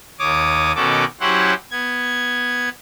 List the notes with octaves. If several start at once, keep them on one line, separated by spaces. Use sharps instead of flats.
D#2 C#5 D6 D#6
B2 D#3 C#4 F#4 A4 D6
F#3 C#4 E4 G4 C5 F#5
B3 G#6